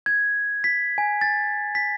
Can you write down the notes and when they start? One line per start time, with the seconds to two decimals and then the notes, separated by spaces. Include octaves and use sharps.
0.06 G#6
0.64 B6
0.98 G#5
1.21 A6
1.75 B6